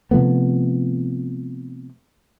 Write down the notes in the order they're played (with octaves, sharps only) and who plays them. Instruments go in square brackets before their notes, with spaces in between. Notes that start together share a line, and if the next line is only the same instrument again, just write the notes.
[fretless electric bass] C3 F3 A3 B3